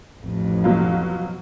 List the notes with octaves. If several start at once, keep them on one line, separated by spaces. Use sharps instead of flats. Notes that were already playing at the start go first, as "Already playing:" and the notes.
A1 F2
B2 F#3 F4